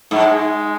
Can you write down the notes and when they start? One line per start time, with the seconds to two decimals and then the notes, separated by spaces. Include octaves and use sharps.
0.11 G#2 F#3
0.23 G#3